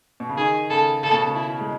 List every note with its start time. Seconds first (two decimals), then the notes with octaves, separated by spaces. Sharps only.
0.20 B2
0.29 C#3
0.37 D#3 G#4
0.70 C#3 A4
1.03 C#3 A4
1.12 B2
1.20 C#3
1.35 E4
1.60 G#3